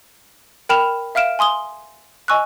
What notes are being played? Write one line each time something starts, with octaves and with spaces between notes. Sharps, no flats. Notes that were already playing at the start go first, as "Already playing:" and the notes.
A#4 G5 B5 F6 E7 F7
E5 F5 F6 D7 E7
G#5 C6 D#6 G7
D#5 G#5 C#6 E6 F#6